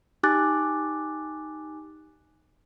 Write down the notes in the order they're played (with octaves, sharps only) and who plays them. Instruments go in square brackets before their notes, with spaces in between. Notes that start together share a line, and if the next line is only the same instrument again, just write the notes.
[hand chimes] D#4 G4 G#5 D6 F#6 A6